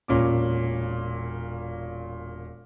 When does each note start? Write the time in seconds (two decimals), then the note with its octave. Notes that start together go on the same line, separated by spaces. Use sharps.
0.08 E1 A#2 C#4 D6